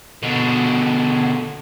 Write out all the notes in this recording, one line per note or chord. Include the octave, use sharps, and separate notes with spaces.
B2 D3